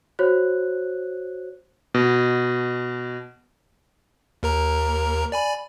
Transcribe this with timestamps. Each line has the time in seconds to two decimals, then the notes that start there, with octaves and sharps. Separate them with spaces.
0.19 F#4 C5 C#5 F#6
1.94 B2
4.43 D#2 A#4 A#5
5.32 D5 G#5 B5